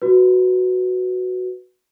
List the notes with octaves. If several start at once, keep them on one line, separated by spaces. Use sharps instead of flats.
F#4 B4